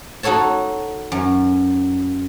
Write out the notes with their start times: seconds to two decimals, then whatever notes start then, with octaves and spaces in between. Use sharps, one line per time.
0.23 D#4 F#4 A4 C#5 A5
1.12 F#2